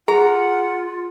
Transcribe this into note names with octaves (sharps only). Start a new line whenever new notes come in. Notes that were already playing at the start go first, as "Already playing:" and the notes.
F4 G#4 F#5 A#5